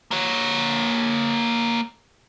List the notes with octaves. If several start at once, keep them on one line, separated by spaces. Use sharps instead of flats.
A#3 C#5